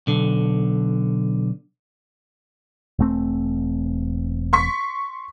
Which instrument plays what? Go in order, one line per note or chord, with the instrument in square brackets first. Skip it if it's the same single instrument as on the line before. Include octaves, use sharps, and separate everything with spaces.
[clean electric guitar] B1 D3
[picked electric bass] E1 A3 C4
[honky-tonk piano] C6 C#6 B6